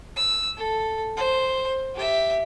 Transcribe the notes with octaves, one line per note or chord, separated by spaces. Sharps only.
E6
A4
C5
G4 E5